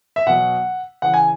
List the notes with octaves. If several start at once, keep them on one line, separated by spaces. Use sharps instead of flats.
E5
B2 F#3 F#5
C#3 E3 F#5
G#5